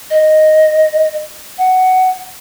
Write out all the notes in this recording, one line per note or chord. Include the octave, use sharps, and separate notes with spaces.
D#5
F#5